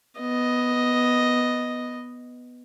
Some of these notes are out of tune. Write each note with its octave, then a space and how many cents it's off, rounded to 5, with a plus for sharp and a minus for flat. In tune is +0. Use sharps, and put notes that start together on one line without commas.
B3 +0 D#5 +0